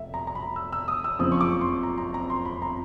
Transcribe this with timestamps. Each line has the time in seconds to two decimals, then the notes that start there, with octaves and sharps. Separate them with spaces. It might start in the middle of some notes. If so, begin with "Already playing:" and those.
Already playing: F1 E5
0.14 A#5
0.27 A#5
0.35 B5
0.56 E6
0.73 E6
0.88 D#6
1.04 E6
1.19 F#1 F2 C#3 F3 D#6
1.32 C#6
1.41 D6
1.61 C6
1.83 A#5
1.98 A#5
2.14 A#5
2.30 C6
2.45 B5
2.62 A#5